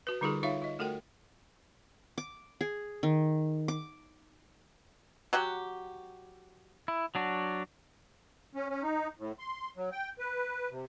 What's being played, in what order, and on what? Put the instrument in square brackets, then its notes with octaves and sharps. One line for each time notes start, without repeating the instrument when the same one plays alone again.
[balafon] F#4 B4
D3 G3 D#4 F4 G#4 A4
D#4 F4 C#5 E5 F5
F4 D#5
A3 F#4 A4 A#4 G5
[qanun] D6
G#4
D#3
D6
[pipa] F#3 F#4 G4
[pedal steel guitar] E4
F#3 D4 F#4
[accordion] C#4
C#4
D#4
A2
C6
F#3
G5
B4
C3